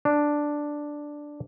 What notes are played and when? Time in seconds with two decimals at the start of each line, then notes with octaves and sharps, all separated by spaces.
0.05 D4